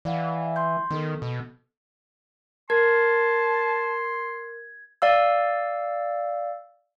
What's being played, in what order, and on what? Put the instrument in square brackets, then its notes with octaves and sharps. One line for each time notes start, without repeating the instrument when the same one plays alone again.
[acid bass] E3 [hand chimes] D5 F5 F#5
[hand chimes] C6 G6
[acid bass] D#3 [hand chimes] B3 A4
[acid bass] B2
[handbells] A#4 [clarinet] A5 [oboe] C6 [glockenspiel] G#6
[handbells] D5 F5 E6